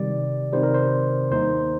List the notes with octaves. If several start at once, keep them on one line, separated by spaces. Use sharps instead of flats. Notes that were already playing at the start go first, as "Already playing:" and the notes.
Already playing: C3 D#3 G3 D5
C3 D#3 G3 C5
A#4
C5
D#2 D#3 A#3 D#4 C5